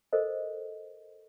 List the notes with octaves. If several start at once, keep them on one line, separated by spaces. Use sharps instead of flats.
A4 A#4 C5 D#5